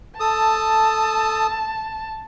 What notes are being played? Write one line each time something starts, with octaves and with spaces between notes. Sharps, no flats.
A4 A5 D#6